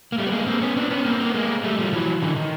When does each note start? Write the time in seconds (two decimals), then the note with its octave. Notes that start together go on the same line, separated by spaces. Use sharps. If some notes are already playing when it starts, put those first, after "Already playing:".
0.12 A#3
0.18 G3 A3
0.26 B3
0.32 G#3 A#3
0.47 A#3 C4
0.61 B3 C#4
0.76 C4 D4
0.90 B3 C#4
1.05 A#3 C4
1.20 A#3 C4
1.29 B3
1.34 G#3 A#3
1.64 G3 A3
1.78 F3 G3
1.92 E3 F#3
2.22 D3 E3
2.36 D#3